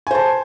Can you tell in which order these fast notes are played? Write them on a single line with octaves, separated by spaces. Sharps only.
G#5 C5 A5